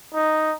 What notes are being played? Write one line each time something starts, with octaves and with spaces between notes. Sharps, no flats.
D#4